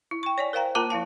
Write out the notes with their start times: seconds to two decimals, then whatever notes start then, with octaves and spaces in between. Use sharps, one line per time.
0.11 E4
0.23 G5 C#6
0.38 C#5 D5 G#5
0.53 A#4 C5 F5 G5 A#5
0.75 A#3 F4 A#4 A5 A#5 D6
0.90 F3 E4 F5 A5